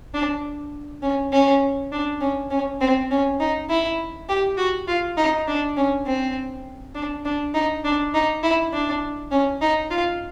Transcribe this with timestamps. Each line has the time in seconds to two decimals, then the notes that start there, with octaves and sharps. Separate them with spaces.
0.14 D4
1.03 C#4
1.32 C#4
1.92 D4
2.21 C#4
2.51 C#4
2.81 C4
3.11 C#4
3.40 D#4
3.70 E4
4.29 G4
4.58 F#4
4.87 F4
5.17 D#4
5.48 D4
5.77 C#4
6.06 C4
6.95 D4
7.25 D4
7.54 D#4
7.85 D4
8.14 D#4
8.43 E4
8.73 D4
9.32 C#4
9.62 D#4
9.91 F4